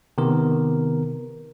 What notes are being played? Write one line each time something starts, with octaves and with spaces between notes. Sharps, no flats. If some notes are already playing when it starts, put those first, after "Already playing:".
C3 D#3 B3 A#4